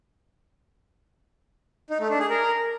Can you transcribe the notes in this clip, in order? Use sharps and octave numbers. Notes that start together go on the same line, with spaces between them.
D#4
A3
D4
G#4
A#4